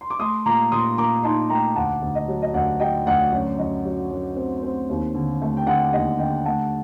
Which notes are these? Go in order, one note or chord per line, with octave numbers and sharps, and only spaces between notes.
C6
D6
A3 C6 D#6
A#2 A#5 D6
A#2 C6 D#6
A#2 A#5 D6
D#4 A5 C6
A3 G5 A#5
D2 F#5 A5
D2
D#5
F#3
D#5
D2 D5 F#5
F#3 D#5 G5
D2 D5 F#5
F#2 D5
F#2 D#5
F#3 D5
F#2
C4
C4
D#2
D3
A3
G5
D3 D5 F#5
D#2 D#5
D3 D#5 G5
A3 F#5 A5